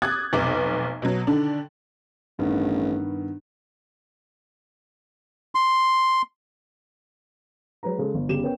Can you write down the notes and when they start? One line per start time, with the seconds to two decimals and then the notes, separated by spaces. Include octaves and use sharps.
0.02 D6 D#6 F#6 G#6 A6
0.33 F1 B1 B3 D6
1.02 B2 F#3
1.27 D3 D#3 D4
2.39 A1 G2 D#3 B3
5.55 C6
7.83 F#3 G#3 B4 A#5
7.98 C#3 G#3 A4
8.14 G1
8.28 G1 C#3 G4 E7
8.43 B3 C#4 A#4 B4 C#5 G5